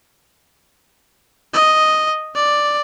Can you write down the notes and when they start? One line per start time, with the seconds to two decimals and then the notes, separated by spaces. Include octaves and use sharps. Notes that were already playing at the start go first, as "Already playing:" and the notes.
1.54 D#5
2.35 D5